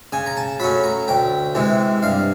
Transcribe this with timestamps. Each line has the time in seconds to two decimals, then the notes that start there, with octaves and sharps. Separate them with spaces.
0.12 C#3 G#5
0.26 A#5
0.37 A5
0.60 F#3 A3 C#4 B5
0.84 A#5
1.08 D2 G5
1.55 C3 E3 G#3
2.03 G2 F5